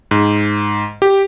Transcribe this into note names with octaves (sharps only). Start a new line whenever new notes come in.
G#2
G4